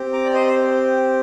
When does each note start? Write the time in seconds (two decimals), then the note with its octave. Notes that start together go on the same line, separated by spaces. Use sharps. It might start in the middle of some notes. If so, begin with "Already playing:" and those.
Already playing: C4 G4
0.13 A#5 D6
0.25 D5
0.34 C5 D#5
0.47 C5